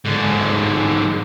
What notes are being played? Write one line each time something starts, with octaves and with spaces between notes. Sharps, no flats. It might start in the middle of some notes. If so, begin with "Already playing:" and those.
G#2 D3